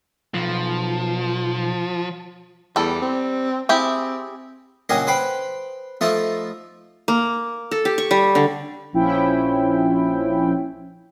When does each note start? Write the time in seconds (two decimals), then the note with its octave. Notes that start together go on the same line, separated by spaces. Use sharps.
0.34 B1 F3
2.76 E2 G3 A4
3.02 C4
3.69 C4 E4 G4 G#4
4.89 A#1 C#3 F#3 G4 G#4 D#5
5.07 B4 C5 G5 B5
6.01 F3 A3 D#4 E4
7.08 A#3
7.71 A4
7.85 G4
7.98 C#6
8.11 G3
8.35 D3
8.93 A#1 F3 C#4 E4 G5